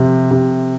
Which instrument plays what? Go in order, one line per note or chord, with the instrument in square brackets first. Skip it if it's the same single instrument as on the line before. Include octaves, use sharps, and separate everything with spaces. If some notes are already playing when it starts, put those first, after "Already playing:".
Already playing: [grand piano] C3 [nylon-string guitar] F3 A3
[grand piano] C3